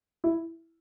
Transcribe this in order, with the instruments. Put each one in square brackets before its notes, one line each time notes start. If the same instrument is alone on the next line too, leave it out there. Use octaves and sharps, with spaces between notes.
[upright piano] E4